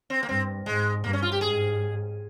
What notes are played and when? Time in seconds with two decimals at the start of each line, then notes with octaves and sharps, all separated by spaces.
0.10 C4
0.23 A#3
0.29 G2 C4
0.66 G#2 G#3
1.03 G2 A#3
1.13 C#4
1.22 F4
1.32 G4
1.41 G#2 G#4